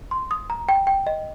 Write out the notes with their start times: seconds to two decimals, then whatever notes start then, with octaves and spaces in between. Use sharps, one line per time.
0.11 C6
0.31 D#6
0.50 A#5
0.69 G5
0.87 G5
1.07 D#5